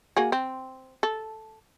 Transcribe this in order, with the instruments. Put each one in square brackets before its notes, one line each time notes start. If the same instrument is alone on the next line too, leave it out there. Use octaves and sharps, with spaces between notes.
[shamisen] A#3 F#4 G#4
C4
A4